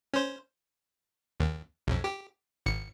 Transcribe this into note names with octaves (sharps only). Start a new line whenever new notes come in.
C#4 C5
D#2
B1 F2
G4
G#1 C#7